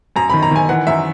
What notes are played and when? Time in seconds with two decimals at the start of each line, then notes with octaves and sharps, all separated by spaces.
0.16 F#2 A#5
0.30 D#3 B5
0.43 A#5
0.51 D#3 G#5
0.69 E3 F#5
0.87 F#2 E5